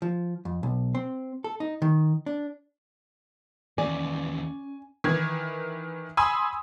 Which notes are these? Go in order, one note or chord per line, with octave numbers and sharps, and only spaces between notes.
F3
F2
B1
C4
A4
D#4
D#3
D4
D#2 E3 C#4 D5 G#5
D#3 E3 G#6
G#5 B5 C6 D#6 E6